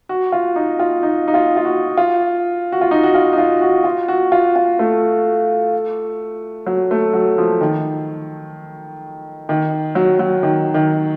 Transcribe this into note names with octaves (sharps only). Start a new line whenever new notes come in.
F#4
F4
D#4
F4
D#4
D#4
F4
F4
F#4
F4
F#4
F4
D#4
F#4
F4
D#4
F4
F#4
F4
F#4
F4
F4
A3
F#3
A3
F#3
F3
D#3
D#3
F#3
F#3
D#3
D#3